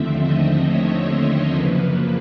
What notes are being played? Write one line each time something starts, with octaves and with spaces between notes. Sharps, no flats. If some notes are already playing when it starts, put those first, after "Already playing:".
Already playing: D#2 D3 F3 A3 C4 E5
D#5
C#5
C5
F#2 C#3 F3 A#3 B4